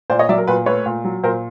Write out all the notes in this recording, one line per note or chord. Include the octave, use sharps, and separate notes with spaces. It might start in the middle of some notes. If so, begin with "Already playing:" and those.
A#2 C5 D5
C#5 D#5
F#3 D5 E5
A#4
A#2 B4
A3 B4 C#5
A#2
F#3
A#2 A#4 C5